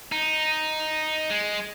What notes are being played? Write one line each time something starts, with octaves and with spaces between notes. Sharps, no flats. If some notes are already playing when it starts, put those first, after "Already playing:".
D#4
G#3